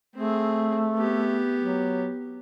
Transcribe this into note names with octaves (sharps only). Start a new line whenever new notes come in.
A3 C4 G#4
B3 G4
F#3